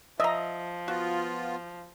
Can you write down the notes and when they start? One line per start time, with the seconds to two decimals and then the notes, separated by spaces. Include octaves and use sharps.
0.20 F3 D#5 E5 A#5
0.88 B3 F4 F#4